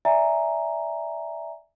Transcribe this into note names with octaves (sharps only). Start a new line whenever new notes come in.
D5 E5 G#5 A#5